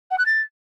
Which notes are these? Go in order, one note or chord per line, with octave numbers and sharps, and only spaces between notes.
F#5
F#6
A6